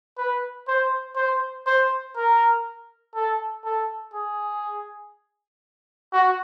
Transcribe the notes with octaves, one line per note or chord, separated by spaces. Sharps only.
B4
C5
C5
C5
A#4
A4
A4
G#4
F#4